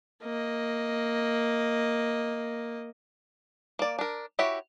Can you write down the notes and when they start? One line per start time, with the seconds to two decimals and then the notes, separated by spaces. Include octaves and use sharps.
0.23 A#3 D#5
3.79 A#3 D5
3.99 D4 A#4
4.39 E4 F#4 G4 C#5 E5